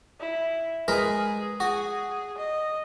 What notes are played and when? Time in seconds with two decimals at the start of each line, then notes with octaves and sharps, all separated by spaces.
0.20 E4
0.88 G#3 G#4 A#4 B4
1.60 F#4 G#4
2.37 D#5